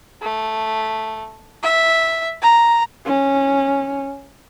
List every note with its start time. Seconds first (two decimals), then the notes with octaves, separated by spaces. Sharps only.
0.22 A3
1.63 E5
2.42 A#5
3.06 C#4